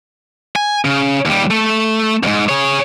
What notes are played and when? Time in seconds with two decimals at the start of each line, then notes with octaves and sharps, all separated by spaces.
0.56 G#5
0.85 C#3
1.25 D#2 G3
1.51 A3
2.23 F2 G#2
2.49 G#4 C#5